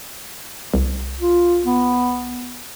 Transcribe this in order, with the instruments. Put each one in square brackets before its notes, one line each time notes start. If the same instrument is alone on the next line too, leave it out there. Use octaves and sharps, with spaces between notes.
[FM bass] C2
[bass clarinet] F4
B3